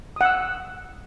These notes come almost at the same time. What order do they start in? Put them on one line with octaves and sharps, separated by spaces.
D#6 F#5 E6